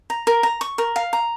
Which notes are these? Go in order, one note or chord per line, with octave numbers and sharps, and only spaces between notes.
A#5
A#4
A#5
C#6
A#4
F5
A#5